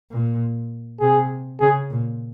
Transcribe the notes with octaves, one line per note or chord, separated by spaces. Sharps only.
A#2
C3 G#4
C#3 G#4
A#2